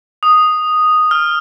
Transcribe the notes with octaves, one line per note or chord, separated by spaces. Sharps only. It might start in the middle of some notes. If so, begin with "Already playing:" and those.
D#6
F6